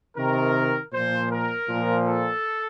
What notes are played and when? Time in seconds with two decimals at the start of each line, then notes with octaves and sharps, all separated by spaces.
0.17 C3 D#3 A#4
0.93 A#2 F3 C5
1.31 A#4
1.69 A#2 F3
2.07 A4